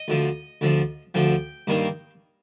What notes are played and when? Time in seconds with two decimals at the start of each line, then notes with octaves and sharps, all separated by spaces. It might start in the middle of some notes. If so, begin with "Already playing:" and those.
Already playing: D#5
0.08 D2 D3 F3
0.61 D2 D3 F3
1.14 D2 D3 F3 G5
1.67 G2 D#3 A#3 D#4